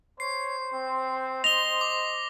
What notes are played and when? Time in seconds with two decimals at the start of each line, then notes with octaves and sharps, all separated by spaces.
0.20 C5 C#5 C7
0.73 C4
1.44 D#5 A#6 F7 G7
1.81 D6